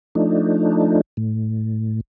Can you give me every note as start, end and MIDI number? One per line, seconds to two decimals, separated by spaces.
0.15 1.01 53
0.15 1.01 57
0.15 1.01 62
0.15 1.01 63
1.17 2.00 45